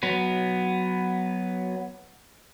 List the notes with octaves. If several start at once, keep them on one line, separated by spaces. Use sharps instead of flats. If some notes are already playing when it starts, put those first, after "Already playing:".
F#3 B3